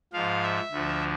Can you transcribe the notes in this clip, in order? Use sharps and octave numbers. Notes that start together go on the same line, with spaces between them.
G#2 F3 F5
E5
D2 D3 F3